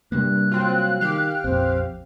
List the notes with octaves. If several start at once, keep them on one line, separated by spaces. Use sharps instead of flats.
G2 C3 G3 A#3 F#6
F#3 C4 F4
D#3 G4 F5
A#1 F2 C4